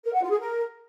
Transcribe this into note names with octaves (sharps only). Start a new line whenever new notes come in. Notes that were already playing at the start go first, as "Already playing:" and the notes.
A#4
F#5
F4
G#4
A#4